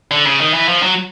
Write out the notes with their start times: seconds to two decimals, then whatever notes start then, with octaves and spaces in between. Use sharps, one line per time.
0.11 D3
0.25 C#3
0.40 D#3
0.54 E3
0.68 F3
0.83 F#3